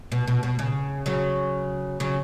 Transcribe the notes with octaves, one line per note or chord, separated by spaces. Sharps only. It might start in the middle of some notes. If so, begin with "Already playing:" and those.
B2
B2
B2
C#3
C#3 F#3
C#3 F#3